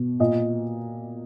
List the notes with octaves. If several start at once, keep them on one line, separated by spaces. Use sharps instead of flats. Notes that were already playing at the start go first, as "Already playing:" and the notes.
Already playing: B2
A#2 D#5